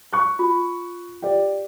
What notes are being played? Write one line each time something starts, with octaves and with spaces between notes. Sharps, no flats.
C#6 F#6
F4
G4 D5